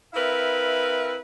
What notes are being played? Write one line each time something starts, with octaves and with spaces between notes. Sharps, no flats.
C4 E4 A#4 B4 E5 F5